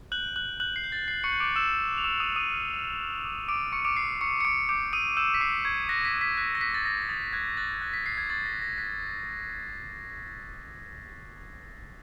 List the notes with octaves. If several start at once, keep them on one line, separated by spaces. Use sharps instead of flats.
F#6 G6 F#7
F#6 G6 F#7
F#6 G6 F#7
C7
G6
A6
G6 C7
C#6 C#7
G6
D6 D7
E6 G6 E7
G6
F7
D6 E6 E7
D#6 D#7
F6
D#6 D#7
F6
F6
F6
D6
D6 D7
C#6 D6 C#7
D6 D7
C#6 C7
C#6 C#7
C#7
C#6 D6 D7
D6 G6 D7
D#6 E6 D#7
E6 G6 E7
B6
C#6 C7
C#6 G#6
F#6 A#6
B6
F#6
B6
F#6 B6
A#6
F#6 B6
A6
D#6 A#6
D#6 A6
F#6 G#6
F#6 A6
F#6 A#6
B6
F#6 C7
G#6
C#6 A6
A#6
F#6
A#6
F#6 B6